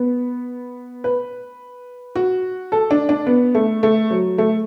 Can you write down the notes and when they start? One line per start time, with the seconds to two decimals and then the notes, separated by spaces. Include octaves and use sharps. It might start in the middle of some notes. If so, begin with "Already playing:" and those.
Already playing: B3
1.04 B4
2.16 F#4
2.72 A4
2.91 D4
3.09 D4
3.27 B3
3.55 A3
3.83 A3
4.11 F#3
4.38 A3